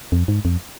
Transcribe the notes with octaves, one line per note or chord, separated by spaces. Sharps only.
F2
G#2
F2